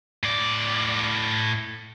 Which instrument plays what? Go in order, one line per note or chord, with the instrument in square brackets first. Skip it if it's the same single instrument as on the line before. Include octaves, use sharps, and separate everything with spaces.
[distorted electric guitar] A2 D5